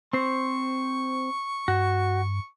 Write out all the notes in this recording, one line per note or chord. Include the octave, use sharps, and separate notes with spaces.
C4 C5 C#6
G2 F#4